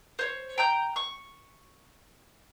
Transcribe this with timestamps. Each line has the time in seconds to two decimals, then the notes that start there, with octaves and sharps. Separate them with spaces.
0.19 C5 C#5
0.58 G5 A#5 G6
0.96 C#6